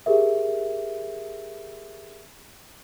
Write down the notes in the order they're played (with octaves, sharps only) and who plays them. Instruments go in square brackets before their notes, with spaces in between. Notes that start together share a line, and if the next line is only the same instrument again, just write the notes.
[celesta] G4 G#4 A#4 E5